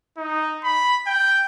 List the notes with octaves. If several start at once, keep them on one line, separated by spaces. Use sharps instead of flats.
D#4
B5
G5